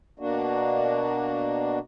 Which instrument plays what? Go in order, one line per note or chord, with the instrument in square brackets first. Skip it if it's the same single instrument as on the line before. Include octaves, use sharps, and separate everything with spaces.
[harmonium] B2 A#3 D4 F#4